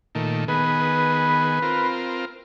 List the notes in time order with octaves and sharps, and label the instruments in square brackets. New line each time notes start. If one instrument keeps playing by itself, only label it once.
[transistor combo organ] A#2 D#3 A3
[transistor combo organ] D#3 B3 G#4 [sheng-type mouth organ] B4
[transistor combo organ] C4 F4 A#4